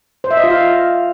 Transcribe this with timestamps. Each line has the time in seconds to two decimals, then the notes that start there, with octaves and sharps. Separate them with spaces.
0.24 C5
0.31 E5
0.37 D#5
0.44 F4
0.50 F5